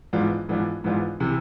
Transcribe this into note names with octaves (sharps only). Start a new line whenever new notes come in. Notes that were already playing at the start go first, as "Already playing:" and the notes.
G#2 E3 B3 D4 F4
G#2 E3 B3 D4 F4
G#2 E3 B3 D4 F4
C3 E3